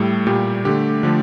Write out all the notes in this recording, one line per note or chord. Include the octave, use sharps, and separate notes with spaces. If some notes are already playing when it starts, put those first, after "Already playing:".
Already playing: A2 G3 A4
A#2 G3 G4
D3 A3 G4
D3 F3 A3